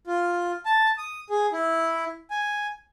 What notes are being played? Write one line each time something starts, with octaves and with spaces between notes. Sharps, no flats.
F4
A5
D#6
G#4
E4
G#5